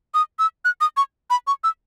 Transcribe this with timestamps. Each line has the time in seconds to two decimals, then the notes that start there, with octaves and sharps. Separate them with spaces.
0.14 D#6
0.39 E6
0.65 F#6
0.81 D#6
0.97 C#6
1.30 B5
1.47 C#6
1.64 E6